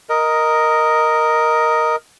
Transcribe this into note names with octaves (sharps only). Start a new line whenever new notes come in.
A#4 D#5